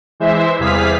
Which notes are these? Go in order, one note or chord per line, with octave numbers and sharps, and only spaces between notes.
E3 G#3 C5 E5
E2 C3 G3 G#4 F5 B6